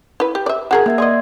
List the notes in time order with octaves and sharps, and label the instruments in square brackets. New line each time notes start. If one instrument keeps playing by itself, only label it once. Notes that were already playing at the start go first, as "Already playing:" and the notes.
[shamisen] E4 B4
G4
D5 E5
[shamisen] F#4 G#4 A#4 [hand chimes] F#5 G#6
[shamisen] D#3 [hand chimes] A#3 E5 G#6
[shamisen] G#4 D#5 [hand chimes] D5 C6 G#6